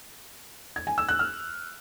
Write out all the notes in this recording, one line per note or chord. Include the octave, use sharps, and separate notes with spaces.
G#6
G#5
E6
F#6
F6